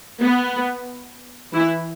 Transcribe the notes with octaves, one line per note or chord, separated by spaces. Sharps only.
B3
E3 E4